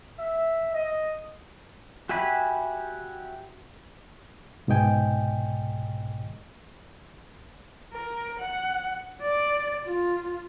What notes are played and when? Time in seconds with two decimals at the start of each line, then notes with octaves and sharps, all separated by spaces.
0.19 E5
0.73 D#5
2.09 F#4 G4 E5 G#5 B5
4.67 C2 G#2 B2 D#5 G5 G#5
7.92 A#4
8.39 F#5
9.21 D5
9.86 F4